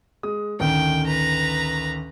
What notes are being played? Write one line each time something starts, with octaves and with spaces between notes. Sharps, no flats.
G#3 D#6
A1 D2 D#3 G5
B4 A#5